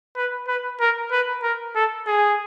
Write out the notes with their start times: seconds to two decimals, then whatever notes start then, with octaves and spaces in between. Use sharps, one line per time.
0.16 B4
0.47 B4
0.80 A#4
1.12 B4
1.43 A#4
1.75 A4
2.07 G#4